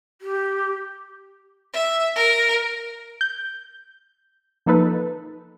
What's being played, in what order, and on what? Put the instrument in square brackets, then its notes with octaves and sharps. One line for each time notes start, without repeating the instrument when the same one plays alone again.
[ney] G4
[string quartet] E5
A#4
[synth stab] G6
F3 A#3 D#4 A4 B4